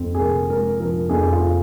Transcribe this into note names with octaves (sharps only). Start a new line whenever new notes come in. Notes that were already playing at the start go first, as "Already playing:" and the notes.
Already playing: F2 F3 C4
G#4
F1 A#4
G#3 A#4
F3 A#4
F2 G#4
F4